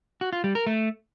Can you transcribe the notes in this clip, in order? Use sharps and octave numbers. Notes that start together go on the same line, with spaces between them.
F#4
F4
G3
A#4
A3